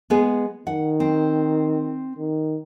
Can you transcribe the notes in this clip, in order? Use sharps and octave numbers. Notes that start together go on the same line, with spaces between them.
G#3 B3 G#4
D#3 F#5
C4
D#3